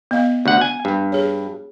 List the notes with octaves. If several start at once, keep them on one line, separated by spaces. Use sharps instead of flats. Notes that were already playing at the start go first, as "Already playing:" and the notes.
B3 D#5 F5
D2 F#5
G#5
G2
G#4 C#5